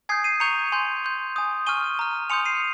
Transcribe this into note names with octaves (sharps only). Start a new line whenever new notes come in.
G#5 D#6 G6 G#6 C7
C7 D#7
A#5 C#6 G6 C#7 F7
G#5 C6 G6
C6 G6
G#5 D#6 G6
G#5 C#6 F6 D#7 G7
A#5 F6
G#5 C6 D#6 G6 C#7 F7
C7 D#7